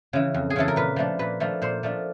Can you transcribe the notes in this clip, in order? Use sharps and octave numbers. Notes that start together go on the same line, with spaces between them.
C#3 E3
F2
G#4
C#3 E3 A4
A#4
A#2 B4
F3 A3 D4
A#2 B4
F3 A3 D4
A#2 C5
F3 A3 D4